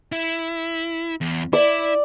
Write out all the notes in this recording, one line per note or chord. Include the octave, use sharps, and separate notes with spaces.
E4
E2
E4 D5